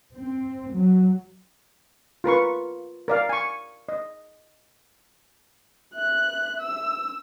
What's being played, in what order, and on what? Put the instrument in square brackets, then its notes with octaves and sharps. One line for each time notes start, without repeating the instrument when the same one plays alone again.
[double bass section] C4
F#3
[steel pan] F4 A#4 B4 C#6
A#4 D5 F5
G#5 C#6
D#5
[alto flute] E5 [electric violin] F#6
[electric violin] E6